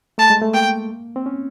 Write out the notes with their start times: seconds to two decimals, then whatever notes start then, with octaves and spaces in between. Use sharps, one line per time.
0.18 A3 A5
0.30 G#3
0.42 A3
0.54 A#3 G5
1.16 C4
1.26 C#4